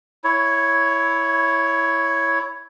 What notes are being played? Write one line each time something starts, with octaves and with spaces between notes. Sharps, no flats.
E4 C#5